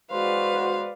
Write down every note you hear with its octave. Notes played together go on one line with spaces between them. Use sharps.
G#3 F#4 B4 C5 D5 F5